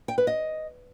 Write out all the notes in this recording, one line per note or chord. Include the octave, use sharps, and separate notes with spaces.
G5
B4
D#5